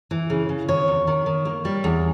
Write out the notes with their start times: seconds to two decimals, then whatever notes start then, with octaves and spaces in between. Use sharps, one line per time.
0.11 E3
0.30 C#3
0.49 C#3
0.69 D#3 C#5
0.88 E2
1.07 D#3
1.26 D#3
1.45 A#3
1.65 G3
1.84 E2